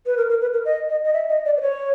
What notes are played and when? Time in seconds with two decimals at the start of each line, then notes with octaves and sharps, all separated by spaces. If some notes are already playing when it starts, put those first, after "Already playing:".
0.06 B4
0.17 A#4
0.30 A#4
0.41 B4
0.53 A#4
0.65 D#5
0.89 D#5
1.04 D#5
1.14 E5
1.30 D#5
1.45 D5
1.57 C5
1.61 C#5